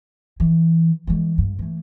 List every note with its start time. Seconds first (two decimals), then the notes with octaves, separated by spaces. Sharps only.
0.40 E3
1.07 E3 G#3
1.38 G2
1.59 E3 A3